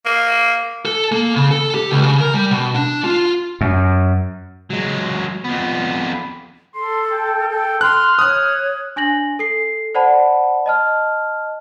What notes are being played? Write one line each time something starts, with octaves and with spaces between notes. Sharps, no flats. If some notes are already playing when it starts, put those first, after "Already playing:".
A#3
A4
A#3
C#3
A4
G4
C#2
C#3
A#4
G3
B2
D4
F4
F#2
F#3 G#3
F2 B3
A4 C6
G5
A4 G5
C6 F6 F#6
C#5 D#6 F#6
D4 G#5 A#6 F#7
A4 C7
C5 D5 F#5 A5 B5
D#5 A5 F6